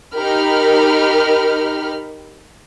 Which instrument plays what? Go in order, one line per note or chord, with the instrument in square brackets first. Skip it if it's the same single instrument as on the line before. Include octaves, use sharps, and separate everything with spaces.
[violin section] D#4 G4 A#4 B5 F6